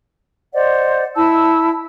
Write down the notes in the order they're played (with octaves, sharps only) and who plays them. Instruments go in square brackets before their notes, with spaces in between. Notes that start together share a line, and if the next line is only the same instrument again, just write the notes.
[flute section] C5 D5 D#5 F#5
E4 A5 E6